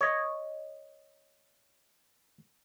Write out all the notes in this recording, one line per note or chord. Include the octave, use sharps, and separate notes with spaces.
C#5 D#5